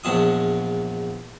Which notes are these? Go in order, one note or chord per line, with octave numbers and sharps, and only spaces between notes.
A#1 E2 E4 D#6